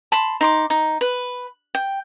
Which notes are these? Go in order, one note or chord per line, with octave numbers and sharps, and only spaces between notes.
A5 B5 C6
D#4 C6 D6
D#4
B4
G5